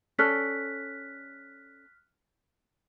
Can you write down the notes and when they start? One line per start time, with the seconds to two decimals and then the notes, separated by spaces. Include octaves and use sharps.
0.19 C#4 A4 D5 F6 F#6 B6